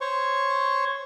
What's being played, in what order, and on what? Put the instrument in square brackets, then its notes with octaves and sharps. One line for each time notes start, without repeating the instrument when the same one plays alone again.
[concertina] C5 C#5 C#6